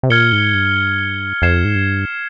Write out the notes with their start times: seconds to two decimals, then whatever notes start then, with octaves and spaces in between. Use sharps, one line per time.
0.03 C3
0.10 A#2 F6 G#6 C#7 G7
0.32 G#2
0.54 G2
1.42 F2 G#6 C7 E7
1.65 G#2
1.75 G2